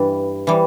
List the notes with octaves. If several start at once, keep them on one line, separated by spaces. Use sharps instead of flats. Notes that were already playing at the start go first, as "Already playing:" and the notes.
Already playing: G2 E3 G3
E3 G3